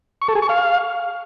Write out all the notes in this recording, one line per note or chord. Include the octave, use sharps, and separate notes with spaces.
C#6
A4
G#4
C#6
F5